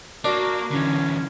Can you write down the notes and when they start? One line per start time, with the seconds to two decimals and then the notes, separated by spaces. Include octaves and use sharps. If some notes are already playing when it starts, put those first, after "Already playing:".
0.25 A#3 D4 F#4
0.71 D3 E3 C#4